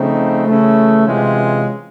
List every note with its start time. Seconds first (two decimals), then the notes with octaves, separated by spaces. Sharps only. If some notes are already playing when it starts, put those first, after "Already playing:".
Already playing: C#3 F3 A3 C4 D#4
0.47 C#3 E3 A3
1.05 C3 E3 G#3 C#4 F4